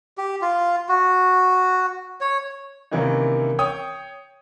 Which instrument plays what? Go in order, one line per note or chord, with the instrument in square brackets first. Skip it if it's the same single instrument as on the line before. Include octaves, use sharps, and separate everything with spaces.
[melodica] G4
F4
F#4
C#5
[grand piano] C3 D#3 E3 A#3 C#4 D#4
C#5 G5 D#6